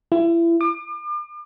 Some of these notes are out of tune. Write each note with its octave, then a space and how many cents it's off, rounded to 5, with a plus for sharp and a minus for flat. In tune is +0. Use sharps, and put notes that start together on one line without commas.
E4 +30
D6 +40